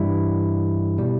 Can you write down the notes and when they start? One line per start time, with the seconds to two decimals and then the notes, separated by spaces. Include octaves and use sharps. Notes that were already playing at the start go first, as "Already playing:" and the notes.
Already playing: G2 E3 G3 E4
0.98 B2 G3